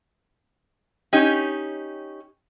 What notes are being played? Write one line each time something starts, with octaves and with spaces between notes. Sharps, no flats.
C#4 D#4 G4